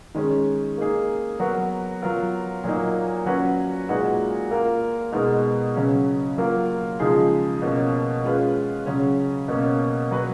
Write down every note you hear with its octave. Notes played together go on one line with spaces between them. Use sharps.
D#3 G#3 C#4
A#3 D#4 G#4
F#3 B3 F#4 A#4
F#3 B3 F4 A#4
A#2 F#3 A#3 D#4
F#3 C#4 F#4 B4
A#2 G#3 D#4 F#4 B4
A#3 F4 A#4
B2 G#3 B3 D#4 A#4
C#3 F#3 C#4
F#3 A#3 F4 A#4
C#3 F3 G#3 D#4 G#4
B2 A#3 C#4
G#3 C#4 F4 B4
C#3 F#3 C#4
B2 A#3 C#4
F#3 B3 F#4 B4